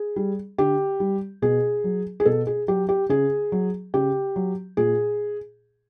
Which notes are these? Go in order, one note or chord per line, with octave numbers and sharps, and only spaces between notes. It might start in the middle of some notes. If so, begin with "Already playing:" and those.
Already playing: G#4
G3
D3 G4
G3
B2 G#4
F#3
G#4
B2 A4
G#4
F#3 G4
G4
C#3 G#4
F#3
C#3 G4
F#3
A#2 G#4